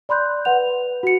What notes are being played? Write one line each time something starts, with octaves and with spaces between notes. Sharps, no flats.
D5 B5 C6 F#6 G6
B4 F#5 F7
F#4 C#7